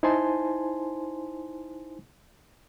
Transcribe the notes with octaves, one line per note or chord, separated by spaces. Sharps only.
D#4 E4 C5 G#5 A5 C6